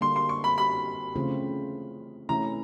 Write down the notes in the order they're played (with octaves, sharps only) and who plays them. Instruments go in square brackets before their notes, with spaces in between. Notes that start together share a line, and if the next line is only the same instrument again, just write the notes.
[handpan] D3 G3 A#3 D4 [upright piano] C6
[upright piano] C6
C#6
B5
B5
[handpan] C#3 E3 A3 C4 F4
[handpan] C3 E3 A3 C#4 E4 [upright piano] A#5